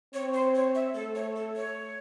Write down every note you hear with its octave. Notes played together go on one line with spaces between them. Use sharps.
C4 C#5
C5
C#5
E5
A3 A4
C#5
A4
C#5